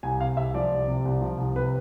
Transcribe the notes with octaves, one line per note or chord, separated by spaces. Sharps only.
C2 G#5
C3 F5
C2 E5
F3 D5
C2
C3
C2
F3
C2
C3 B4